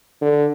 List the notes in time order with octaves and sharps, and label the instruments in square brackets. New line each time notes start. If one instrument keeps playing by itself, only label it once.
[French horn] D3